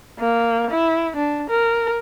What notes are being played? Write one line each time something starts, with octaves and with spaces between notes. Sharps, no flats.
A#3
E4
D4
A#4